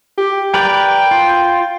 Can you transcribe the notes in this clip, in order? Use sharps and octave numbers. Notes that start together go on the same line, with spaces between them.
G4
A#4 B4 D5 G5
F4